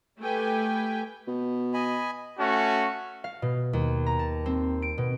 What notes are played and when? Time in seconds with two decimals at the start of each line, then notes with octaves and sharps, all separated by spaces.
0.20 A3 G4 B4 G5 G#5
1.28 B2
1.74 D#5 G#5 B5
2.39 A3 C#4 F#4
3.24 F5
3.42 B2
3.73 D#2
4.06 A#5
4.19 A5
4.46 C4
4.82 D7
4.98 B2